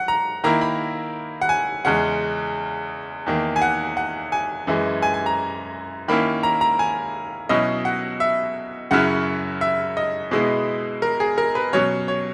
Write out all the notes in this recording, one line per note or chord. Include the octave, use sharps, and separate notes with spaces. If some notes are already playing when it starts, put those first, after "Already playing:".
Already playing: F#3 F#5
A#5
D#3 A#3 E4 A#5
B5
F#5
G#5
E2 C#3 G#3 C#4 F#5
E2 D#3 A#3
G#5
F#5
F#5
G#5
F#2 E3 G#3
G#5
G#5
A#5
D#3 A#3 C#4 E4 B5
A#5
A#5
G#5
B2 F#3 C#4 E4 D#5
F#5
E5
F#2 C#3 F#3 C#4 E4 F#5
E5
D#5
B2 G#3 B3 E4
A#4
G#4
A#4
B4
B2 F#3 C#4 C#5
C#5